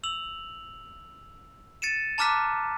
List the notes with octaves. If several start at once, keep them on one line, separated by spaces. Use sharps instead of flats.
E6 F7 F#7
A6 C#7 D#7 E7
A5 A#5 D6 F6 F#6 B6